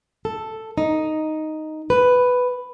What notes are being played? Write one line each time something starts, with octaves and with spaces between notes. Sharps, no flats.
A4
D#4
B4